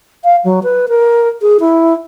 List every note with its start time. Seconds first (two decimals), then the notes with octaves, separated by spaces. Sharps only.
0.24 F5
0.44 F#3
0.63 B4
0.88 A#4
1.42 G#4
1.60 E4